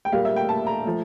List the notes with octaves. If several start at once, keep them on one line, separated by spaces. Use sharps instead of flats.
G5
A#2 G3 A#3 F5
E5
G5
A5
A#5
F3 A3